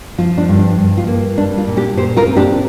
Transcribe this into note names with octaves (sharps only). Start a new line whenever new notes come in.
F3 F4
D4
G2
D4
G2
F4
A#3
G3 D4
F4
A#2
D4 G4
A#2 G4 C5
F4 A#4
C4
D4 G4